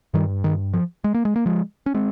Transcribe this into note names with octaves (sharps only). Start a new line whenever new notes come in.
G2 D#3 G3
D#3
F3
G#3
A#3
G#3
A#3
F3 G#3
C#4
G#3 C4